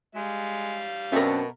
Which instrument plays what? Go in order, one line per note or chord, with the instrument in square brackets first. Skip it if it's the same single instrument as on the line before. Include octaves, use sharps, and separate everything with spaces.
[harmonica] G3 F5 [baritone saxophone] G#3
[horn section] F#2 C4 D4 [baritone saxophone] B2 [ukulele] A#4 E5